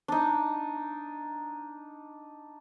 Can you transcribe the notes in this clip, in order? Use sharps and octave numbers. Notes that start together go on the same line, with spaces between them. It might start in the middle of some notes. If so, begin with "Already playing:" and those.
D4 D#4